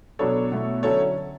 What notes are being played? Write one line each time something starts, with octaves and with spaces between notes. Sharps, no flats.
B2 F#3 B3 D4 A4 C#5
B2 A3 E4
D3 F#3 C#4 E4 A4 C#5